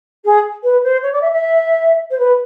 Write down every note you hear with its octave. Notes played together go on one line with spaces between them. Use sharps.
G#4
B4
C5
C#5
D5
E5
E5
C5
B4